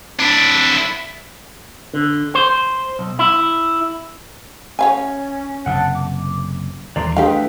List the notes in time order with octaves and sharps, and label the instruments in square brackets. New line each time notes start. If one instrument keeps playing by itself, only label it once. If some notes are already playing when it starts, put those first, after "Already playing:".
[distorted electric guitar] D4 E4
[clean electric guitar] D3
C5
B1
E4
[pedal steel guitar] C#4 [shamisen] C#5 F5 G#5
[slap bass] F#1 C3 [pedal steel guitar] F#5 A5
[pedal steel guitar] D6
[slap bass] D#2 E3 G3 [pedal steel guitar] D5 A#5 C6
[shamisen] G#3 G4 F5 [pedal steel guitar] A3 E4 B4 [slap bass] D4